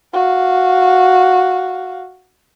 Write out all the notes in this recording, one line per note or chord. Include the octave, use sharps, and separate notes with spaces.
F#4 F5